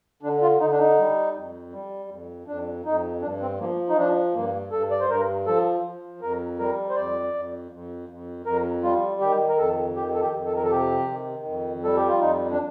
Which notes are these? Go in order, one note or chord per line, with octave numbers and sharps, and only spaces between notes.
D3 D4
F4
D3 D#4
D4
D#4
G3
F2
G3
F2
F2 D4
F2 D#4
G2 D4
C4
F3 A#3
D#4
F3 D4
G2 A#3
G2 A4
D5
C5
G2 A#4
F3 A4
F3
F2 A#4
G3 A#4
C5
F2 D5
F2
F2
F2
F2 A#4
G3 F4
D#3 G4
A#4
F2 A4
D#3 G4
A4
G4
F2
A4
A#4
A4
C3 G4
D#3
F2
G3 A4
G4
F4
F2 D#4
D4